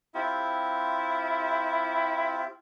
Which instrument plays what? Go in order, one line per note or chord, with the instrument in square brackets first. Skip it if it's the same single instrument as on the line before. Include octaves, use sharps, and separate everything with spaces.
[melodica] C4 F4 G4 [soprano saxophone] E4